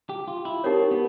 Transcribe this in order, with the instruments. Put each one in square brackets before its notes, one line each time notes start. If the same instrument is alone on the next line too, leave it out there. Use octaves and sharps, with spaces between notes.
[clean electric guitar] G4
F4
E4
[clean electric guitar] C4 [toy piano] D#4 G4 A#4 C#5
[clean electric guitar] B3